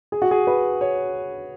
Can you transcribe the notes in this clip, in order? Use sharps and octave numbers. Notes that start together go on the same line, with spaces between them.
G#4
F#4
G#4
B4
C#5